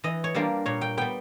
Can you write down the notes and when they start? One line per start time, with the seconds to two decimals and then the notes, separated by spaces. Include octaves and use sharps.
0.04 E3 D#5
0.24 C#5
0.34 G3 A#3 D4 F4
0.66 A#2 C#5
0.81 G5
0.97 G3 B3 G5